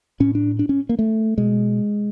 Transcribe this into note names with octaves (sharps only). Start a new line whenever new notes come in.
A2 C#4
D4
D4
C#4
A#3
A3
B2 G#3